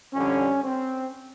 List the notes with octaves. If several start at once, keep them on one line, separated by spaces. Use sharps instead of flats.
F2 D3 G3 C#4
C4